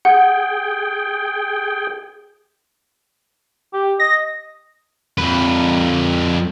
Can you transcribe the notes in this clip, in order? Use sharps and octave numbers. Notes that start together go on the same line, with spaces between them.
G#4 F#5 G5
G4
D#5 A#6
F2 B4